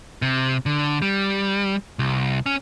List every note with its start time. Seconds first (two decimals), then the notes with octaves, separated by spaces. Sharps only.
0.22 C3
0.66 D3
1.02 G3
1.99 C2
2.46 C#4